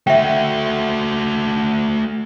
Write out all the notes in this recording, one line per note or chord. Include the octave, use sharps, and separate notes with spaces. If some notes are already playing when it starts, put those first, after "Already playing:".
A3 F#4 E5 G5